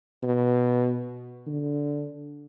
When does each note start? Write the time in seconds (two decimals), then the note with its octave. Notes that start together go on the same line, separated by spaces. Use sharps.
0.23 B2
1.46 D3